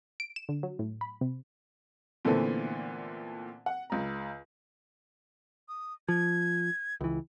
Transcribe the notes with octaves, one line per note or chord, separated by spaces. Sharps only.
D7
E7
D3
F#3
A2
B5
C3
A#2 D3 E3 A3 B3 C4
F#5
C#2 A#5
D#6
F3 G#6
C#2 E3